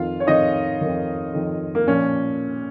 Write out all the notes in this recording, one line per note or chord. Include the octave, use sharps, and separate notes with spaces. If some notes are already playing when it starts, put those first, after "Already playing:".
Already playing: F2 D#3 F4 F5
C#5
F2 D#3 D#4 D#5
F2 D#3
F2 D#3
A#3
A#2 F3 C#4